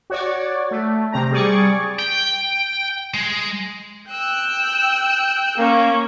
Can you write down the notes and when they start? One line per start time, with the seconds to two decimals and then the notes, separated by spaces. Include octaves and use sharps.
0.10 F#4 C#5 D5
0.71 A3
1.12 C3 C4 A#5
1.31 G3 G#4 D5 C#6
1.99 G5
3.14 G#3
4.11 G5 E6 F#6
5.58 A#3 C#4